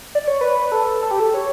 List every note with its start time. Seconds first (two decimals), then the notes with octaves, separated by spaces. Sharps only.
0.15 D5
0.27 C#5
0.41 B4
0.72 A4
1.03 A4
1.11 G4
1.20 A4
1.34 C#5